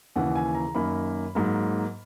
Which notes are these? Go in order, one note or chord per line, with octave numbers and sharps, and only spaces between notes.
D#2 C#3 E3 F#5
G#5
A#5
F#2 D#3 A#3 B5
G#2 F#3 A#3